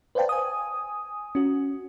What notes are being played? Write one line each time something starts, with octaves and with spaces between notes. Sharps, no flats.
B4 C5 D5 F5 G5 A5
G#5 D#6
C#4 F#4